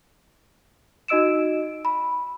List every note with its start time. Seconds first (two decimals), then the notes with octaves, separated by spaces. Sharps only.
1.08 D#4 F#4 D#5 E6 D7 E7
1.85 B5